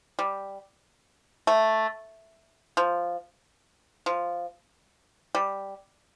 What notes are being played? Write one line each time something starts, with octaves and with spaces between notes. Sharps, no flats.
G3
A3
F3
F3
G3